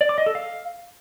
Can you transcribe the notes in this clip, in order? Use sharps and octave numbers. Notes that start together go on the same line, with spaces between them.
D5
D6
D#5
A4
F5